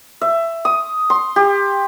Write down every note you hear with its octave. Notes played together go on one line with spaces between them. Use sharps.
E5
D#6
C6
G4